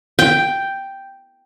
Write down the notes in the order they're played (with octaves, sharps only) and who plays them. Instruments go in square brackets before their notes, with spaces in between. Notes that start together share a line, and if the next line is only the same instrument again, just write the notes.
[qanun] G5